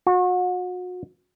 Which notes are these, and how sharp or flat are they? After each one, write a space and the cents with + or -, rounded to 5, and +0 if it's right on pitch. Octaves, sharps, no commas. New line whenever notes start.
F#4 -35